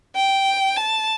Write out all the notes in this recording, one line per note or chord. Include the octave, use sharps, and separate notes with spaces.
G5
A5